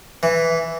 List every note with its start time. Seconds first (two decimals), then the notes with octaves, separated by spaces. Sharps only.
0.23 E3